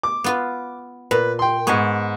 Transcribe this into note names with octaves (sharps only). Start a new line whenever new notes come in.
D6
B3 F4 B4
A#2 B4
G5 C6
G#2 B3 G#5 C#6